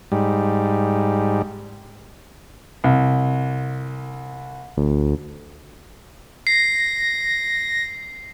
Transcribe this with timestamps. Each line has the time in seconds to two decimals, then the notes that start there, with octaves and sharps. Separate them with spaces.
0.12 G#2 G3
2.84 C2
4.77 D2
6.47 A#6 C7